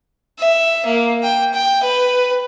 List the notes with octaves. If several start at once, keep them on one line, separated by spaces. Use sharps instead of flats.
E5
A#3
G5
G5
B4